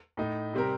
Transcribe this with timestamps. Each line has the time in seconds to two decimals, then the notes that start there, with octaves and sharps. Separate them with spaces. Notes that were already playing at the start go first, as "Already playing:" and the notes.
0.17 A2 A3 D#4
0.53 C3 G3 C4 G4 A#4